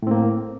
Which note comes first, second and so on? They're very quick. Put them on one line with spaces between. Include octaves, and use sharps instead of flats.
A2 C4 A#3